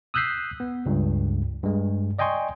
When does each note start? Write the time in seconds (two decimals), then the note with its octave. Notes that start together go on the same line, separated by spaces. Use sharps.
0.14 D#6 E6 F#6 G6 B6 C7
0.60 B3
0.86 C#2 G2
1.63 G2 G#3
2.19 D5 D#5 G5 G#5 C6 C#6